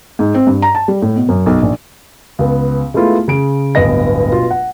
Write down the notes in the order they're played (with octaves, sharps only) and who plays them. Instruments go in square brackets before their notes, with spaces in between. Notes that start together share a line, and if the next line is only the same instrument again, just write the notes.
[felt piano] G#2
C4
G2
A#5
A5
G3
A2
B2
F#2
B1
A#1
[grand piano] C#2 B3
G#3 A3 B3 E4 F4
C#3 D7
D1 G1 B3 D#5 A#6
B2 F4
F#5